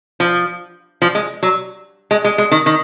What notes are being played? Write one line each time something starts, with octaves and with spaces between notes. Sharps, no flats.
F3
F3
G#3
F#3
G#3
G#3
G#3
D#3
D#3